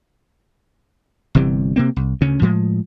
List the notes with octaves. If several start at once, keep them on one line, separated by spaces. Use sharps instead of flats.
G1 C3 E3 G3
C3 A#3 C4
C2
D2 C#3 C#4
A2 F3 G#3